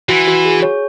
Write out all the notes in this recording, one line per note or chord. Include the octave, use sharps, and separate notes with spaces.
E3 F#4
F#4
G#4
C#5